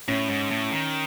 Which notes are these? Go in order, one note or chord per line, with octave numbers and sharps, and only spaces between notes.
A2 C#4
G#2
A2
D#3